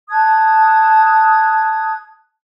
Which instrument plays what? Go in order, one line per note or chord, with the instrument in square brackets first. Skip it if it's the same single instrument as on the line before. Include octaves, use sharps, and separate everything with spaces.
[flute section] A5 D#6 F#6 G#6